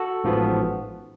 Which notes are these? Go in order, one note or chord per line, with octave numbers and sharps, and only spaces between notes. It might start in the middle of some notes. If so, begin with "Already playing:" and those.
Already playing: F#4 A4
A1 G#2 F3 B3